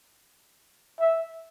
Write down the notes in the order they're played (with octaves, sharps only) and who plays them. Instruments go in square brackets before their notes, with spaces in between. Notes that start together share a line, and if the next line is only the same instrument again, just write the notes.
[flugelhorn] E5